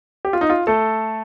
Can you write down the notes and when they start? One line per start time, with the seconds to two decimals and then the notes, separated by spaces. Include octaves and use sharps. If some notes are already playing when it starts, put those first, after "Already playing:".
0.25 G4
0.33 F4
0.41 D#4
0.50 F4
0.67 A3 A4